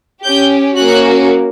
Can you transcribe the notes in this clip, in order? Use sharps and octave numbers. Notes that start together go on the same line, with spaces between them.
C#4 G4 G6
A#3 C#4 F#4 F#6